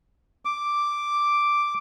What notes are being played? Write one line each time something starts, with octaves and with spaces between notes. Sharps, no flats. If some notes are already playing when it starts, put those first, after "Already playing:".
D6